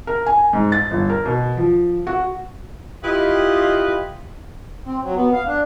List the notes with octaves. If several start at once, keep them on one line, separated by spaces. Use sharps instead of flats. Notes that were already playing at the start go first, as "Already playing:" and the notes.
A#4
G#5
G#2
A6
G1
A#4
B2
F3
F#4
E4 F4 G4 B4 D#5
C4
F#3
B3
F5
D4